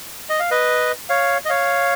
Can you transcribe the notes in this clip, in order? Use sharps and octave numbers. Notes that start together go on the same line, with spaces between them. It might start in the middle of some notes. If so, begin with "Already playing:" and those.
D#5
F5
B4 D#5
C#5 F5
D#5
C#5 F5